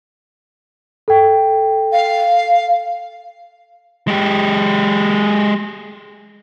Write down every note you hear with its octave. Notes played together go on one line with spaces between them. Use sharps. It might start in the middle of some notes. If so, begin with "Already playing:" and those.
A4 G5
F5
G#3 G4